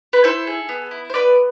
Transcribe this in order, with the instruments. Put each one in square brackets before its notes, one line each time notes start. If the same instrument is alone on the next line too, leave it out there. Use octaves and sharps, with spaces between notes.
[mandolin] B4
E4 A4 C5
G#4
B3
E4
C5
B3 B4 D5